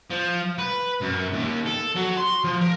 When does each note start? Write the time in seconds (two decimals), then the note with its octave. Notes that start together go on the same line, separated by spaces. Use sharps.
0.10 F3
0.58 B4
1.01 F#2
1.33 D#2
1.66 A4
1.95 F#3
2.17 C6
2.44 F3
2.61 A#4